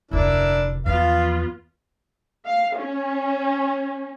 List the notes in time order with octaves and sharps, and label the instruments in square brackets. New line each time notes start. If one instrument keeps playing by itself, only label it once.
[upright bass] F1 D2 [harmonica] D4 E4 A#4
[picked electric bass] E2 [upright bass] F3 [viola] B3 F4 [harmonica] F5
[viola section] F5
C#4